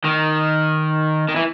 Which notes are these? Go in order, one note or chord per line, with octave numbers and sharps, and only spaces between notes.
D#3
D#3
E3